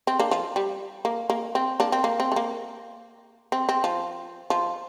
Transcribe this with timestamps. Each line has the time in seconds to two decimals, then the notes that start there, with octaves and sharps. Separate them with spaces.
0.07 C4
0.20 A#3 D4
0.31 F3
0.56 G3
1.05 A#3
1.30 A#3
1.55 C4
1.80 A#3 D4
1.92 C4
2.04 A#3
2.20 C4
2.32 A3
2.36 A#3
3.52 C4
3.69 C4
3.84 F3
4.50 F3